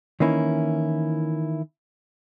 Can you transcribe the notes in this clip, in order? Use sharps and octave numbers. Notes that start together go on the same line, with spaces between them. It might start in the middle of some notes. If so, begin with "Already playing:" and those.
D#3 E3 A#3 C#4 E4